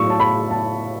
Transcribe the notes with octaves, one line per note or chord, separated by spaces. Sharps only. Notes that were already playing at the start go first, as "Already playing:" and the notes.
Already playing: A2 F#3 C#6 E6
A5
B5
A5